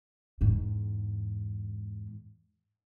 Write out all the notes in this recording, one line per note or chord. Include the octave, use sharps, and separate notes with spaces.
E2 G#2